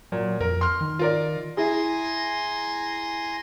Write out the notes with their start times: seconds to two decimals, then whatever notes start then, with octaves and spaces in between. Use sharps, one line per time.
0.12 A#2 F#3
0.41 F2 A#4
0.61 C6 F6
0.81 D#3
0.99 F4 A#4 D5
1.57 E4 G#4 G#5 A#5 C6